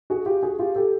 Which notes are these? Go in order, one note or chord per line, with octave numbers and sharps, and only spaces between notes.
F#4 G#4
F4 G4
F#4 G#4
F4 G4
G4 A4